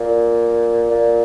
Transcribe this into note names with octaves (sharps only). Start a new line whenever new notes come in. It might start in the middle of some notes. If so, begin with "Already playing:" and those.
Already playing: A#2
A#2